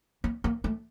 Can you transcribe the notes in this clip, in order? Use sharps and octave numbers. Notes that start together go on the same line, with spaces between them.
A#3
A#3
A3